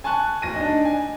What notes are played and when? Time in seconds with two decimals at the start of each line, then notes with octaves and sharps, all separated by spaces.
0.04 G#5 A5 C#6 F#6
0.42 D1 A#6 D#7
0.56 D4 D#4
0.85 G#5